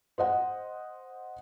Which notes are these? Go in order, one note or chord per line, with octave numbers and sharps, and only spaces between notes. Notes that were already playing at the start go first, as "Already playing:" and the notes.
C5 D#5 F#5